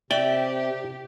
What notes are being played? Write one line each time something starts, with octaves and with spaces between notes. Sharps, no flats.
C3 G4 D5 E5 G5